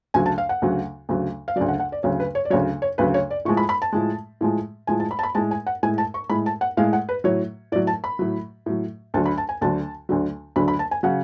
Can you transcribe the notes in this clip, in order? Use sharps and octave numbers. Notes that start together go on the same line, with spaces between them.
D2 C#3 F#3 G#5
A5
F5
F#5
D2 C#3 F#3
D2 C#3 F#3
F5
D2 C#3 F#3 D5
F#5
F#5
D5
D2 C#3 F#3 C#5
B4
C#5
D5
D2 C#3 F#3 C#5
C#5
D2 C#3 F#3 B4
C#5
D5
A2 F3 G#3 C#6
B5
B5
A5
A2 F3 G#3
A2 F3 G#3
A2 F3 G#3 G#5
A5
B5
A5
B5
A2 G#3 A5
G#5
F#5
A2 G#3 G#5
A5
C#6
A2 G#3 B5
A5
F#5
A2 G#3 F5
F#5
B4
A2 F#3 C#5
A2 F#3 D5
A5
B5
A2 F#3
A2 F#3
D2 D3 F#3 A5
B5
A5
G#5
D2 D3 F#3 A5
D2 D3 F#3
D2 D3 F#3 B5
B5
A5
G#5
C#3 F#3 F#5